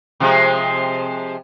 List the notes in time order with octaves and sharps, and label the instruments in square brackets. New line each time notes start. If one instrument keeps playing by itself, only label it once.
[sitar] C3 F3 G#3